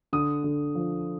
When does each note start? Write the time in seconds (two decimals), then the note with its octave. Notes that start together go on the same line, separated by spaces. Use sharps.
0.13 D3 D#6
0.44 D3
0.75 F3